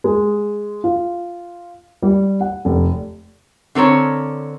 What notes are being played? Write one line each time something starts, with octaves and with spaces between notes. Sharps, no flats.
G#3
F4
G3
F#5
F1
D3 C4 A#4 C#5